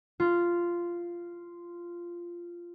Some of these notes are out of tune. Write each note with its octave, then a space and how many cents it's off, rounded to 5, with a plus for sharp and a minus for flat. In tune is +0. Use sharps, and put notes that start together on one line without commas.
F4 -10